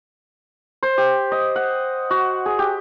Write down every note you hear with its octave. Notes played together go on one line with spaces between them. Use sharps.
C5
G4
D#5
F#5
F#4
G#4
G4